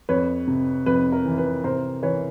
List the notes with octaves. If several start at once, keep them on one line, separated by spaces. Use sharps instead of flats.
F2 B4 C#5
C3
F2 B4
A#4
E3
B4
C3 A#4 C5
E3 B4 C#5